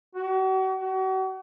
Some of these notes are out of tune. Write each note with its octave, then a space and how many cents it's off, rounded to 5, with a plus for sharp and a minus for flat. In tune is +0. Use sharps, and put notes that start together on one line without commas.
F#4 +40
F#4 +40